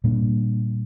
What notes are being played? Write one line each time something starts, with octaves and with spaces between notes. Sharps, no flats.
A#2 G3 A#3 D4